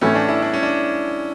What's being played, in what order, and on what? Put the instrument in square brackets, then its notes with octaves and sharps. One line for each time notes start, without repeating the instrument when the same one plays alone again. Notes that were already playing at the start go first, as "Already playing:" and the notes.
[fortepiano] A2 E3 A3 [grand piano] C#4
[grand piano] D4
E4
D4
C#4
D4